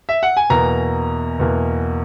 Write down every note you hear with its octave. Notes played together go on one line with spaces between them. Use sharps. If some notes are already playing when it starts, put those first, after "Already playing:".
E5
F#5
G#5
E2 B2 A#3 A#5
E2 B2 A#3